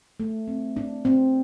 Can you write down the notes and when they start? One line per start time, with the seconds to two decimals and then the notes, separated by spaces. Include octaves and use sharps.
0.20 A3
0.48 C4
0.76 D4
1.05 C4